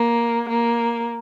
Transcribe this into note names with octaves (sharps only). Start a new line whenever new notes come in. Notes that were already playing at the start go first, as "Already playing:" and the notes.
Already playing: A#3
A#3